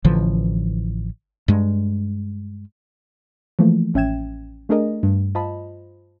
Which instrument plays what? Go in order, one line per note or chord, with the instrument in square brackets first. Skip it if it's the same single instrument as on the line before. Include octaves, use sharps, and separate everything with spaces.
[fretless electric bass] A1 D3 E3 F3
G2 G#3
[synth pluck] E3 F3 A3 A#3
A1 C#4 E5 G5 G#6 E7
A3 D4 G#4 A#4 D#5
G2
F4 C5 D#5 A5 B5